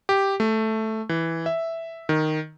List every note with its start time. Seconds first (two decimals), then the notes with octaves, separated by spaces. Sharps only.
0.09 G4
0.40 A3
1.09 E3
1.46 E5
2.09 D#3